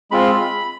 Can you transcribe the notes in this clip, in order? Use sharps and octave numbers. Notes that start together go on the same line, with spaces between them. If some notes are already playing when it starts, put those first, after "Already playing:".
G#3 C4 F4 B5